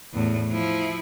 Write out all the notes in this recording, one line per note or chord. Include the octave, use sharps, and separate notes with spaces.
E2 A2
F3 E4